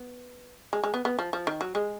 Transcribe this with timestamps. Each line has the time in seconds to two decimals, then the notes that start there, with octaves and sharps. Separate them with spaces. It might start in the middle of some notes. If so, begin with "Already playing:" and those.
Already playing: B3
0.73 G#3
0.83 G#3
0.94 B3
1.05 B3
1.19 F3
1.33 F3
1.47 D#3
1.61 F#3
1.75 G#3